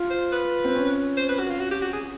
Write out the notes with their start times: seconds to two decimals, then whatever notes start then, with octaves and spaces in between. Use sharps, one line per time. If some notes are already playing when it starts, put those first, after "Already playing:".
Already playing: F4
0.10 C5
0.32 B4
0.65 C4
0.75 C#4
1.17 C5
1.29 B4
1.39 F#4
1.50 F4
1.60 F#4
1.71 G4
1.82 F#4
1.93 G#4